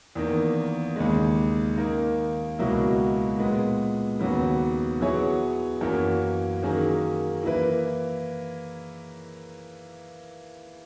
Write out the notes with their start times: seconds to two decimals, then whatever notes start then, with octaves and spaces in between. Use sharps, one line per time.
0.15 E2 D#3 A#3
0.96 D#2 C#3 G#3
1.77 D#3 A#3 D#4
2.59 C#2 B2 F#3 A#3 E4
3.39 A#2 G#3 B3
4.20 D#2 C#3 F#3 B3
5.01 F#3 B3 E4 G#4 C#5
5.81 F#2 E3 A#3 C#4
6.62 D#3 F#3 A#3 C#4 G#4
7.43 E3 A#3 E4 B4